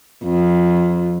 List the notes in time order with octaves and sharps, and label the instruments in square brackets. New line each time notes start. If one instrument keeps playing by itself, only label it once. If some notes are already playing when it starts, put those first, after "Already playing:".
[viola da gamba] F2